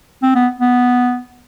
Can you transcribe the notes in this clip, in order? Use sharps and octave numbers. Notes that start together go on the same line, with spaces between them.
C4
B3
B3